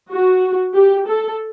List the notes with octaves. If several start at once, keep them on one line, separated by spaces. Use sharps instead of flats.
F#4
G4
A4